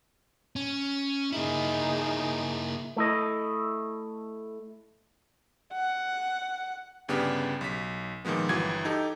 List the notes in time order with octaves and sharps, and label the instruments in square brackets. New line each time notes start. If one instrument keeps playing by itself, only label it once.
[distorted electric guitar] C#4
[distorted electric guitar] A#3 E4 [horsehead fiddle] D#4 G#4
[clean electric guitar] A3 E4 D#5
[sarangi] F#5
[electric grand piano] G1 C#3 B3 D4 G4
B1 B6
A#2 D#3 F3 G#3 B3
G1 E3 F#4 G#6
D#4 G4 A4